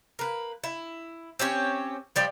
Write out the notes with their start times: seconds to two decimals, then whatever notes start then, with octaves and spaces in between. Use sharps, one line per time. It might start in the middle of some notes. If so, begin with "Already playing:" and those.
0.19 A#3 B4
0.64 E4
1.39 C4 C#4 G4 C#5
2.16 F3 G3 G4